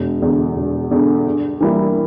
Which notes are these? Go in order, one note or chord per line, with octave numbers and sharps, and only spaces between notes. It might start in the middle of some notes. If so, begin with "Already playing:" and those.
Already playing: E1
E2 D3
E1
E2 D3
G2
E3 G3 A#3 E4